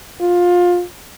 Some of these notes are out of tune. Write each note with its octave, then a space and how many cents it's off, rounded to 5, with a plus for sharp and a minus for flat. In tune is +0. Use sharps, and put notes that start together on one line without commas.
F4 +20